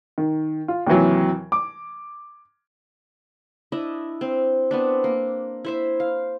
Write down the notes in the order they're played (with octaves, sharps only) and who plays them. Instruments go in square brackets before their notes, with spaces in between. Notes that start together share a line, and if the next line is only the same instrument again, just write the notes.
[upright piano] D#3
F4
D#2 C3 E3 F#3
D6
[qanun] D4 E4 D#5
C4
B3 C4 D4
A#3
E4 C5 E5
F5